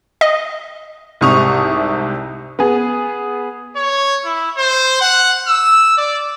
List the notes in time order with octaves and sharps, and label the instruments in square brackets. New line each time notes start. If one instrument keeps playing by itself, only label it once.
[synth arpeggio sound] D#5
[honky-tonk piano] C2 G#2 C3 C#6 D#6 F7
B3 G#4
[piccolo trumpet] C#5
E4
C5
F#5
E6
D5